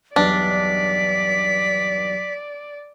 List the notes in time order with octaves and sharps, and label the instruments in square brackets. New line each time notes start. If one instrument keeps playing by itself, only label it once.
[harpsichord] B1 E2 G2 [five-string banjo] D4 [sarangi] D5 [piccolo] B6